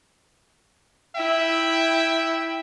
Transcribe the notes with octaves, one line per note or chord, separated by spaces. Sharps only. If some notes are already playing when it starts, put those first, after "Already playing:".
E4 E5 G5